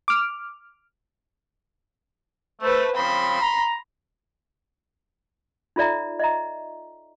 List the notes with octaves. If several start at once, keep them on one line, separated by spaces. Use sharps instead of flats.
D6 F6
A3 B4 C5
C#3 F3 C4 B5 C6
A#5
D#4 F4 A4 D5 E5 A#5
D#5 E5 A#5